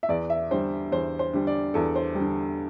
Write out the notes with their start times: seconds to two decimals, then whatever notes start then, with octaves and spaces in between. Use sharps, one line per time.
0.03 E5
0.09 E2 D5
0.30 E5
0.51 D3 G3 C5
0.92 E2 C5
1.19 C5
1.33 D3 G3
1.47 D5
1.74 E2 A4
1.96 C5
2.15 G3
2.21 D3